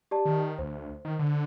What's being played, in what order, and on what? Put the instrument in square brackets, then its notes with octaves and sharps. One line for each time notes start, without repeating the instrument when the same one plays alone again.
[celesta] G4 D5 A5
[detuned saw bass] D#3
[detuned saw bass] D2 [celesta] C5
[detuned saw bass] D#3
D3